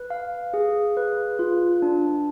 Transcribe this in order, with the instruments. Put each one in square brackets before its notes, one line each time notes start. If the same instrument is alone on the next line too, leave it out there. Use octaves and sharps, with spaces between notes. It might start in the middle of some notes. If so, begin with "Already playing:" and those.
Already playing: [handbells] B4
F5
G#4
B4
F4
D4